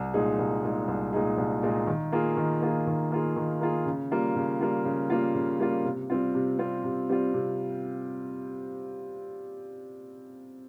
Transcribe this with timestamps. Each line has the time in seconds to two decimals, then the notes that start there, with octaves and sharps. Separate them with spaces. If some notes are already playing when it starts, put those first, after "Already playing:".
Already playing: C2
0.14 A#2 G#3 D#4 G#4
0.39 C2
0.64 A#2 G#3 D#4 G#4
0.88 C2
1.13 A#2 G#3 D#4 G#4
1.38 C2
1.63 A#2 G#3 D#4 G#4
1.87 D#3
2.12 A#3 F4 G#4
2.37 D#3
2.62 A#3 F4 G#4
2.87 D#3
3.12 A#3 F4 G#4
3.36 D#3
3.61 A#3 F4 G#4
3.86 C#3
4.11 G3 A#3 F4
4.36 C#3
4.60 G3 A#3 F4
4.85 C#3
5.10 G3 A#3 F4
5.35 C#3
5.60 G3 A#3 F4
5.85 C3
6.10 G3 C4 F4
6.35 C3
6.59 G3 C4 F4
6.84 C3
7.09 G3 C4 F4
7.34 C3